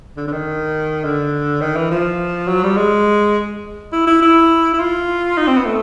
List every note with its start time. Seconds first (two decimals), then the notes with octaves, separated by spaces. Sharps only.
0.17 D3
0.27 D3
0.32 D#3
1.05 D3
1.61 D#3
1.76 E3
1.91 F3
2.48 F#3
2.64 G3
2.77 G#3
3.93 E4
4.07 E4
4.22 E4
4.74 E4
4.80 F4
5.38 D#4
5.48 C4
5.57 B3
5.66 A3